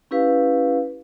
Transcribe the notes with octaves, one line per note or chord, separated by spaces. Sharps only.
C#4 E4 G4 B4 F5